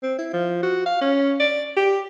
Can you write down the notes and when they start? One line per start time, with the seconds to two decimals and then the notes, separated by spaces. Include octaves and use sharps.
0.03 C4
0.18 E4
0.33 F3
0.63 F#4
0.86 F5
1.01 C#4
1.40 D5
1.76 G4